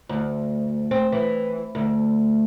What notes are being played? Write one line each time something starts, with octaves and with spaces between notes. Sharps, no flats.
D2
C4
E3
D2